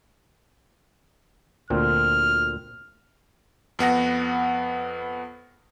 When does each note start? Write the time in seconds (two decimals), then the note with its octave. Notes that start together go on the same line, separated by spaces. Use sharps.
1.70 D2 A#2 C4 F6
3.79 F2 B3 F#5 A#6